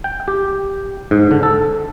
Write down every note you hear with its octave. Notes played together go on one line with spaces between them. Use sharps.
G5
G4
G#2
D3
A4